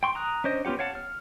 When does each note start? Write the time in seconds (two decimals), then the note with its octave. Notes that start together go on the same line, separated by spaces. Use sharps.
0.03 G5 C6 C#6
0.15 A#5 D#6 F#6
0.44 C#4 D4 C5 D#5
0.65 B3 C#4 F4 G4 F#5
0.79 C#5 F5 F#5 A5
0.95 F6